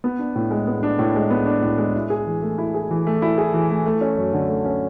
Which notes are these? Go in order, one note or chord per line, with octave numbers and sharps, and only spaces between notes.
B3
D4
A2
G#3
B3
D4
A2
G#3
B3
D4
A2
G#3
E4
G#4
E3
A3
E4
G#4
E3
A3
E4
G#4
E3
A3
A3
C#4
F#2
D3
A3
C#4